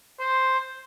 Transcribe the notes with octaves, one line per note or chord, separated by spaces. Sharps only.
C5